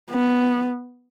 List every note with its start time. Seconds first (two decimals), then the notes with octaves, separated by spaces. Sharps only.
0.10 B3